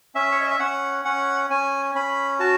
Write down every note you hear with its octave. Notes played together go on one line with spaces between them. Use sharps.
C#4 E5
C#5
D#5
E5
C#4 F#5
C#4 F#5
C#4 G#5
C#4 B5
F#4 A5